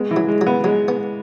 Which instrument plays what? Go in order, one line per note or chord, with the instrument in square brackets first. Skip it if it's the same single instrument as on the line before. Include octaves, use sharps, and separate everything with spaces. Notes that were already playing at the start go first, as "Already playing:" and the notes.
Already playing: [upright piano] G#3 [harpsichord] B3
[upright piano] E3
[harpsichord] F#3
[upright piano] G#3
[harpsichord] F#3
[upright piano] B3
[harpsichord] F#3 [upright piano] G#3
[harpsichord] B3